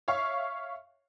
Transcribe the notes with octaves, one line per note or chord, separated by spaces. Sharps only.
C#5 E5 F5 C#6